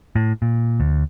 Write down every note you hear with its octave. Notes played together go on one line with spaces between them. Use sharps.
A2
A#2
D2